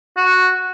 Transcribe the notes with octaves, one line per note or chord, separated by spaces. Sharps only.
F#4